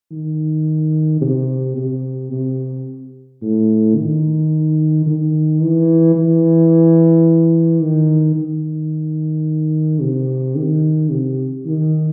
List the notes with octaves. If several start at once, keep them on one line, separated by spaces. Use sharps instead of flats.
D#3
C3
C3
C3
A2
D#3
D#3
E3
E3
D#3
D#3
C3
D#3
C3
D#3